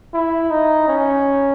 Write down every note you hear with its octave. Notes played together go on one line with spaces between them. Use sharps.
E4
D#4
C#4